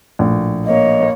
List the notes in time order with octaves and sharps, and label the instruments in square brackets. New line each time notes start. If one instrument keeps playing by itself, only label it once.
[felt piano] A#1 A2
[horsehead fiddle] A#3 C#5 [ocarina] D#5